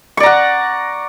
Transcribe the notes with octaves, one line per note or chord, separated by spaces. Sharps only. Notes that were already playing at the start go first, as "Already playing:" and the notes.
D5 F#5 A#5 C#6